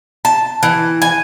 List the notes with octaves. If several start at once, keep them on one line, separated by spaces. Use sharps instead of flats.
A5
E3
G#5